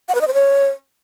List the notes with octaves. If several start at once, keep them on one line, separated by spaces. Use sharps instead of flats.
F#5
B4
D#5
C5
C#5